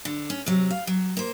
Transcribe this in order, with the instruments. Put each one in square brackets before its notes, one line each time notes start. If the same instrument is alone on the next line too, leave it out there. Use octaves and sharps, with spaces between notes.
[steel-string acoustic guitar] D3
C#4
C3 F#3
F5
F#3
A#3 C5